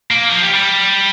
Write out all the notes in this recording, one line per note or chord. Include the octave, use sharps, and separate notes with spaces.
A#3
F3
G3
G3